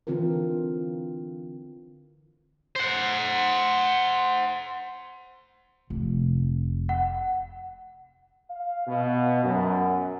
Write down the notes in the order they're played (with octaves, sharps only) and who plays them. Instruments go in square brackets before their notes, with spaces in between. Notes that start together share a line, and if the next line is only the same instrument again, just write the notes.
[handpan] D3 E3 C4 F4 A4 A#4
[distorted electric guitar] C5 F#5
[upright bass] F1
[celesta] F#5
[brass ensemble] F5
B2
F#2